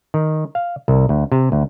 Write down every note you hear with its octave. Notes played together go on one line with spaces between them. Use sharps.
D#3
F5
C2
D2
C3
D2